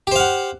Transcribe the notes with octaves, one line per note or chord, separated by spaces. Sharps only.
G4 C5 F5 F#5